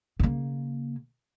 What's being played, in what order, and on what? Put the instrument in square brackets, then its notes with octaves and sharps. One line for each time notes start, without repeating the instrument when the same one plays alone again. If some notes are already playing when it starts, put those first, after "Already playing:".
[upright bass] C#3 A#3